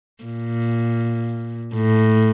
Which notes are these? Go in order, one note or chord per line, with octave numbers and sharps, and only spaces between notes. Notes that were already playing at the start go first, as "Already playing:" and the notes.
A#2
A2